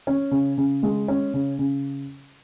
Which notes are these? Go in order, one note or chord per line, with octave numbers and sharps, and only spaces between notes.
C#4
C#3
C#3
G#3
C#4
C#3
C#3